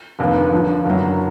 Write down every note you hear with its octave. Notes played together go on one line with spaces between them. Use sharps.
F1 D#2 D3
D#2 D3 F3
F#1 F#2 D3 F#3